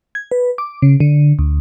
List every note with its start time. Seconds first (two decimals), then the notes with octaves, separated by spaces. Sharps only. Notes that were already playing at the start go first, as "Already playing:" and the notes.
0.15 G#6
0.31 B4
0.58 D6
0.82 C#3
1.00 D3
1.39 D2